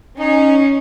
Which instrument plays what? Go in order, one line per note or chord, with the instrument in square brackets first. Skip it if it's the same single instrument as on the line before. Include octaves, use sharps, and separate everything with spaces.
[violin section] C#4 [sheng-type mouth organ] D#4